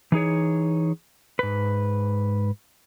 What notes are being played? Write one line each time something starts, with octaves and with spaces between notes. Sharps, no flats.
E3 D#4 G#4 C#5
G#2 B4